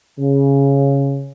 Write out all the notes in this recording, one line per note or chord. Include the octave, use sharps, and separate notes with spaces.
C#3